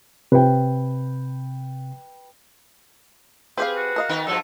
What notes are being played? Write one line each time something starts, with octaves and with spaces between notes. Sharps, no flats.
C3 B4 G5
C4 G4 G#4 B4 F5
F#4
A#4 D#5 F5
D#3 B3 D#4
G2 F3 F#3 A4